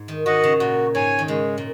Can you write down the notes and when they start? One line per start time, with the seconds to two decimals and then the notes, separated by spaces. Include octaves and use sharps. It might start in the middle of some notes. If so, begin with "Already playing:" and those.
Already playing: G#2
0.08 D#3
0.26 D#3 F#4 D#5 F#5
0.44 C#3
0.60 A#2 F#4
0.94 G#2 C#5 G#5
1.19 D#3
1.28 C#3 G#3
1.58 A#2